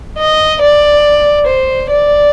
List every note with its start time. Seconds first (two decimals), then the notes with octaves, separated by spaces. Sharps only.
0.18 D#5
0.61 D5
1.47 C5
1.90 D5